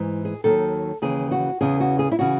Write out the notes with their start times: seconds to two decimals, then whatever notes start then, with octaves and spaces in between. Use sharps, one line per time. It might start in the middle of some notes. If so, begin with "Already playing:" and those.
Already playing: G#2 E3
0.25 G#4
0.44 D#2 D#3 F#3 A4
1.02 D#2 C#3 E3 G#4
1.31 F#4
1.61 E2 C#3 E3 G#4
1.80 F#4
1.99 G#4
2.12 E4
2.19 C#3 E3 F#4